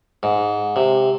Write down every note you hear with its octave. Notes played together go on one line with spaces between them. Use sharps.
G#2
C3